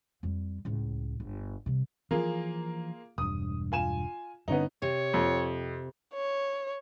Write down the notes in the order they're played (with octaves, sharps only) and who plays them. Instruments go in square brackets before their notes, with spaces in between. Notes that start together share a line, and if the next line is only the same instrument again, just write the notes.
[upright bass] F2 G3
C#2 A2
G1
C3 G3
[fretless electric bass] E3 F3 [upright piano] A#3 F4 G#4
[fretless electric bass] E1 G2 [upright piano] D#6
[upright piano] F4 G#5 E7
[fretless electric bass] G2 D3 [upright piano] B3 C#4 D#4
[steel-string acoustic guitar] C3 [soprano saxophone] C#5
[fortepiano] F2
[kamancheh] C#5